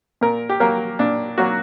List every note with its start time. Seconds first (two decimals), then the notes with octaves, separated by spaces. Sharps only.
0.21 A#2 A#4
0.49 G4
0.60 F#3 A#3 A#4
0.99 A#2 D4
1.38 F#3 A#3 F#4